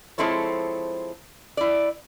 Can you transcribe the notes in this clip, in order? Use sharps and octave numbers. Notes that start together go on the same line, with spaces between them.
F3 G#3 C4 E4 A4 C#5
E4 D5